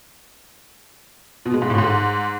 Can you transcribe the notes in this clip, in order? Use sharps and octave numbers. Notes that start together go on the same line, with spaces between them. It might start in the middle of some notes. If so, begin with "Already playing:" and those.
B2
G#3
G#2
A2
G#2